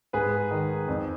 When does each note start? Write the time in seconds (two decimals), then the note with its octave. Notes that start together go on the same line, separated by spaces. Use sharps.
0.13 G#2 G#4 B4
0.51 D#3
0.88 F2